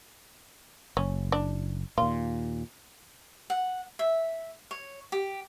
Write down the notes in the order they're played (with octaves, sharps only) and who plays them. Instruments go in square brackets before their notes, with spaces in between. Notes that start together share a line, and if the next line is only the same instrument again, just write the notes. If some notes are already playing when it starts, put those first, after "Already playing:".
[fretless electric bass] F#1 [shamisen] C#4
[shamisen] D4
[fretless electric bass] D#2 A#2 [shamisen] F4
[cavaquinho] F#5
E5
C#5
G4